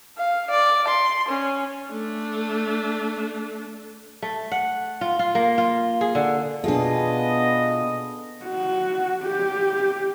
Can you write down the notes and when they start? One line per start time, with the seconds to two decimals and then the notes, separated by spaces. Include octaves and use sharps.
0.18 F5
0.51 D5
0.88 C6
1.29 C#4
1.89 A3 D4
4.22 A3
4.52 F#5
5.01 F4
5.19 F4
5.35 A#3
5.58 F4
6.01 G#4
6.15 D3
6.64 B2 B3 D4 F4 G#4 A4 D#5
8.45 F#4
9.23 G4